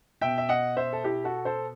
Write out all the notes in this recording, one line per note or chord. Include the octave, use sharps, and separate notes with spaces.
B2 E5 G5
E5
D#5 F#5
C5 E5
A4
E4 G4
F#4 A4
A4 C5